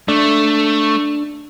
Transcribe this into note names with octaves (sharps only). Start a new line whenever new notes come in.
A3 D4